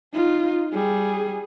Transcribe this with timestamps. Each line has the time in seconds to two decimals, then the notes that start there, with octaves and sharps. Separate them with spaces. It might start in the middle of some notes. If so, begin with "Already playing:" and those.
0.13 D#4 F4
0.72 G3 G#4